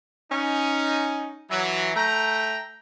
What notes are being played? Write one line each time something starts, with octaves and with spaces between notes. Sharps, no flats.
C#4 D#4
E3 F#3
A3 G5 A#5